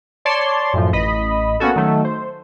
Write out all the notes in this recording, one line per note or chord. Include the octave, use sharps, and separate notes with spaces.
C#5 D5 A5 C6
F#2 A2 F3
A1 D#5 B5
A#3 B3 C#4 F#4 A4
D#3 F#3 A3
C5